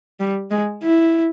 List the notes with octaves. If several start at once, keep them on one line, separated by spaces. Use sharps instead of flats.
G3
G#3
E4